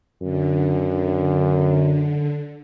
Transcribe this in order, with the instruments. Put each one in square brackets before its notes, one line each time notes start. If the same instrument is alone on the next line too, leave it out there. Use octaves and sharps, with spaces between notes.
[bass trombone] F#2 [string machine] D3